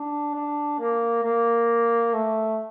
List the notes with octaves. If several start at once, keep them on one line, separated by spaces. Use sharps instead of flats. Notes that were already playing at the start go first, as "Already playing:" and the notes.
Already playing: D4
D4
A#3
A#3
A3